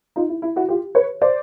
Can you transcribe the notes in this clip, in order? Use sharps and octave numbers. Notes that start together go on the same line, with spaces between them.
D#4 F4
E4
E4
E4 F#4
F4 G4
B4 C#5
C5 D5